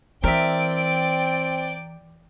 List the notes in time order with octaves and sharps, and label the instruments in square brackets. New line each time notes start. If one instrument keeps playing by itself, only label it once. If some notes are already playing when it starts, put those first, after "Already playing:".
[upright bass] E3 [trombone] C4 [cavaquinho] A#4 E5 [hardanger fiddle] D5 G5